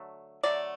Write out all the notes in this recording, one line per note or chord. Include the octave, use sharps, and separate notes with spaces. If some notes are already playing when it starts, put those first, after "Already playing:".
Already playing: D3 F#3 A3
D3 F#3 A3 D5